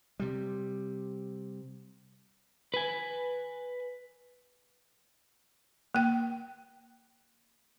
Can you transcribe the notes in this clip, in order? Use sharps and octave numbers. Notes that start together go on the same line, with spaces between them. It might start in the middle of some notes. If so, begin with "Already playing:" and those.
C3 G3
B4 G#5
A#3 G5